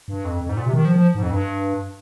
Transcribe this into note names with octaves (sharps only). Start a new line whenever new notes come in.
G2
F2
F2
G#2
A#2
C3
D#3
F3
F3
G#2
F2
G2